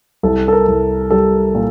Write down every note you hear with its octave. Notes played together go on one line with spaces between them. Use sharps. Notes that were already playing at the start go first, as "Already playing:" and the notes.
C2 A4
A4
A#4
C2
G3 A4
A#2